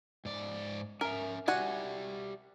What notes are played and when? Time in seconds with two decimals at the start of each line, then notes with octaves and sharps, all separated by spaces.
0.25 G#2 D5
1.01 C#4 A#4 E5
1.48 F#4 G4 D5 E5 F#5 G#5